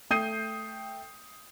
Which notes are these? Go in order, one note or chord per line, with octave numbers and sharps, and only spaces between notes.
A3 G5 D#6 G6 C7 D#7